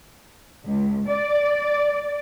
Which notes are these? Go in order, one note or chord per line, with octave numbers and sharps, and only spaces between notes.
C#2
D5